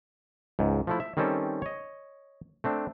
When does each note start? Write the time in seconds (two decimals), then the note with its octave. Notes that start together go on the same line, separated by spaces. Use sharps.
0.59 C#2 G#2
0.87 F3 A3 E4
1.00 E5
1.17 D#3 G3 C4 C#4 A4
1.62 C#5 D#5
2.64 A3 C4 D4